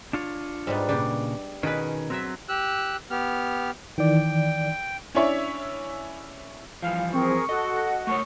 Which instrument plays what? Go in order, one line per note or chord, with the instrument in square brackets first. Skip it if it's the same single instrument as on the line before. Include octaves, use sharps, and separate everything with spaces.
[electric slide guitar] D4 F4 C#5
[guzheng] G#2 G3 B3
[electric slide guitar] A#2 C#3 [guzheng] D4 G4
[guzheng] B2 G#4 B4 [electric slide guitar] D#3 C#4
[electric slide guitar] F#3 C4 [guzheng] A#4 E5
[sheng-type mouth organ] G4 E6 F#6
B3 G4 F6
[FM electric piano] D#3 E3 D5 [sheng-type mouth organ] G5
[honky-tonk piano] C#4 D4 E4 C#5 E5
[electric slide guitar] G2 E3 F3 [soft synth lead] F5
[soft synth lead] C4 [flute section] G#4 A#4 [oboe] C#6
[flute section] F#4 F#5 [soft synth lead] A4 [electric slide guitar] D#5
[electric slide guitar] A3 A#4 C#5 [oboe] C#6